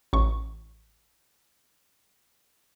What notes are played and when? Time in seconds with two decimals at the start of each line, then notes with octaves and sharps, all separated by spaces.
0.13 A1 C#6